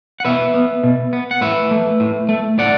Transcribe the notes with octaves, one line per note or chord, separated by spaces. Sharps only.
F#5
B2 B4 E5
B3
B2
B3
F#5
A2 B4 E5
A3
A2
A3
A2 D5 F#5